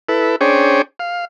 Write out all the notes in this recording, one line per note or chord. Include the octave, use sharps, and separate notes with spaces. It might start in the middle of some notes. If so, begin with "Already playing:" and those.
E4 A4 B4
C#4 D4 G#4 C5 C#5 G5
F5